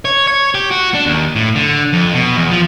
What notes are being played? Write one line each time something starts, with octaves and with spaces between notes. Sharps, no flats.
C#5
C#5
G4
F#4
D4
D#2
A2
D3
F2
B2
E2
F3